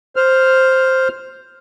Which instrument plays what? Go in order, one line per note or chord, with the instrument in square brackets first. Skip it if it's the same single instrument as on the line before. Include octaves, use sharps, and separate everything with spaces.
[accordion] C5 F6